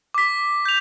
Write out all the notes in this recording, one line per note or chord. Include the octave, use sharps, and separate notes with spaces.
D6 B6
G6 F7